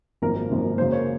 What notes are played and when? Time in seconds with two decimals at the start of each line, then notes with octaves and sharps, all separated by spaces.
0.22 G#1 F#2 F3 A#3 A#4
0.36 A#4
0.50 G#1 F#2 F3 A#3
0.78 F#2 C#3 F#3 A#3 C5
0.92 C#5